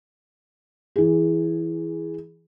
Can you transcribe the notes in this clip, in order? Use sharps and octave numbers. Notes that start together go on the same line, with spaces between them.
E3 G#4